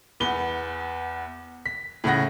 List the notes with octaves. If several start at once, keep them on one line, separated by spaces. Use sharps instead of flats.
E2 B3 G7
B6
A2 C#3 F#5 A#6